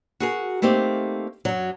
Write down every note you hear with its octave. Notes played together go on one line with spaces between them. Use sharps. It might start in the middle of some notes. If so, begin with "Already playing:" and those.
F#4 G#4 A#4
A3 A#3 C4 D#4 G4
F#2 F#3